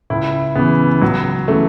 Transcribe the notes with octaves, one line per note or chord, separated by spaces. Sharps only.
C#2 E4
C#3 E3 B3
C#2 F#3
C#3 E3 A3